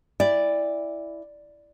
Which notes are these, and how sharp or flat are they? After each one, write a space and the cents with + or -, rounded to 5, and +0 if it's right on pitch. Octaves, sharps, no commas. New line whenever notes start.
E4 +0 D5 +0 G5 +45